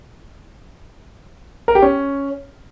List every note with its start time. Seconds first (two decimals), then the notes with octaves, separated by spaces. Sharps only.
1.68 A#4
1.75 G4
1.82 C#4